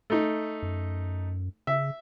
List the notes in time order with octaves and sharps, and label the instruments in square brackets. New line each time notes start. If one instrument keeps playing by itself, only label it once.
[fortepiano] A3 D#4
[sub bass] F#2
[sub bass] C#3 [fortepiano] E5